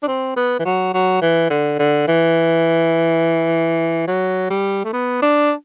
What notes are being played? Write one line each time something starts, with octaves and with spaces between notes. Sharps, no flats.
D4
C4
B3
E3
F#3
F#3
E3
D3
D3
E3
F#3
G3
A3
B3
D4